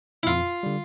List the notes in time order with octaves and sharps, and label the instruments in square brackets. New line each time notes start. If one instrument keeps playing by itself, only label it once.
[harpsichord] E4
[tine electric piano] F2 [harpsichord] F4
[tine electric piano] D3 G3